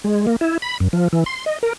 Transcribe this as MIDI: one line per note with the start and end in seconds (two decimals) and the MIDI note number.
0.04 0.26 56
0.27 0.36 58
0.41 0.58 64
0.62 0.78 83
0.80 0.88 42
0.93 1.08 53
1.13 1.24 52
1.26 1.45 84
1.46 1.58 75
1.63 1.73 70